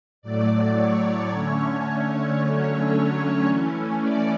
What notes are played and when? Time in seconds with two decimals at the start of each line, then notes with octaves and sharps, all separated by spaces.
0.22 A2 F#3 A3 D5
0.76 C#5
1.30 D3 A3 C#4
1.85 C#5
2.39 D3 F#3 A3 C#4
3.47 E3 A3 C#4
4.00 D5